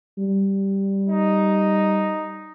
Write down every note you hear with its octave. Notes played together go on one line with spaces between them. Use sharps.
G3
D#4